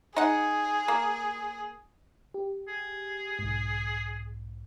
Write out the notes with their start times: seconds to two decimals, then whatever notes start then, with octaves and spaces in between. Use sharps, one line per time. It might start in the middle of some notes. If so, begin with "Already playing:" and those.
0.16 D#4 G#4 F#5
0.88 A#3
2.34 G4
2.68 G#4
3.39 B1 G#2